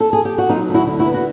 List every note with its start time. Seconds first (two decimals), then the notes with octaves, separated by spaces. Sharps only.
0.00 A4
0.13 G#4
0.25 G4
0.38 F#4
0.49 F#3 D#4 F4
0.69 D2
0.74 E4 F#4
0.87 D3
0.99 E4 F#4
1.06 B3
1.14 F#4